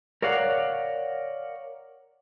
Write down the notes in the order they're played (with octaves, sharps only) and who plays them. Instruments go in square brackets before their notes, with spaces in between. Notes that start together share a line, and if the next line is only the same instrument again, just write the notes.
[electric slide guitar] A#4 C#5 D5 F5 F#5